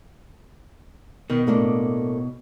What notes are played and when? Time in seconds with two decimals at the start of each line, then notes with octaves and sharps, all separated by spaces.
1.30 B2 D#3
1.47 A2 A#3 D4